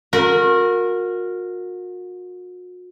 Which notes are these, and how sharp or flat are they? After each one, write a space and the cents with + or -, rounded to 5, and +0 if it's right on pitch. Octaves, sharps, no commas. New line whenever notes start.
F#4 -40 A#4 -10 B5 -40